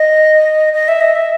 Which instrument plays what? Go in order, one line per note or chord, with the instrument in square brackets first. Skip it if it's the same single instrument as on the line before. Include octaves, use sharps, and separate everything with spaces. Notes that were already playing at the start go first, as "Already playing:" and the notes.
Already playing: [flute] D#5
D#5
E5
D#5
E5